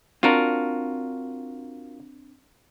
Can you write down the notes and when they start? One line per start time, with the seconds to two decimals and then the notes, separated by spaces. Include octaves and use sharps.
0.23 C4 D4 F4 F#4 A#4 B5